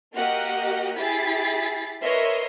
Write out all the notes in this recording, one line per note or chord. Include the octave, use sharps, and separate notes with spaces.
A#3 F#4 G4 A#4 D#5 F#5
E4 G4 G#4 A6 B6 C7
A#4 B4 C#5 D#5 E5 C6